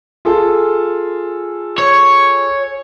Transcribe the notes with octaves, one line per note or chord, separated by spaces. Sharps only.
F4 G#4 A4
C#5